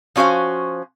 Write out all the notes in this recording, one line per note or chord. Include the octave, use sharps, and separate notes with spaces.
F3 C#4 F#4 C5 F5